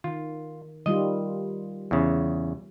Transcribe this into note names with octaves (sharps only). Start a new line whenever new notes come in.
D#3 F4
D#3 G3 F4 D#5
E2 C#3